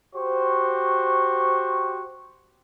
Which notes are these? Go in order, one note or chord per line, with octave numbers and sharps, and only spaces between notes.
F#4 G4 C5 C#6